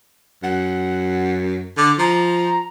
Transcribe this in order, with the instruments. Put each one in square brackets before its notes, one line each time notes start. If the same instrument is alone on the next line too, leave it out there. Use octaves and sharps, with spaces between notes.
[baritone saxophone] F#2 [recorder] F#5
[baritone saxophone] D3 [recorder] D6
[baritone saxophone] F3 [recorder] A#5